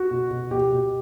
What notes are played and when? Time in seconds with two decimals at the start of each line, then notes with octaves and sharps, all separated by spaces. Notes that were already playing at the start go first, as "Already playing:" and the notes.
Already playing: F#4
0.11 B2
0.31 B2
0.51 B2 G4
0.72 B2